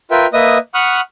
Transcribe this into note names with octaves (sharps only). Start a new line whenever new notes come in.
F4 A#4 B4 E5 G5
A#3 B4 D#5 E5 D#6
F#5 B5 C#6 D#6 F6 F#6